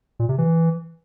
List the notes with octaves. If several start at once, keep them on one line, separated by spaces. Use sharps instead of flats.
A#2
C3
E3